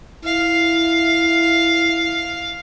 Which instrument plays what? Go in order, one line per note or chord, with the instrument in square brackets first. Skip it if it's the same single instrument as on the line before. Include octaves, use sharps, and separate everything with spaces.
[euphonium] E4 [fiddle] F5